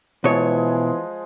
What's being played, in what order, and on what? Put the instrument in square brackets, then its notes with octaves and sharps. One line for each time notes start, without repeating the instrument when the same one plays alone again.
[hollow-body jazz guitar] B2 C#5 [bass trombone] E3 [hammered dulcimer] F3 G#3 G#4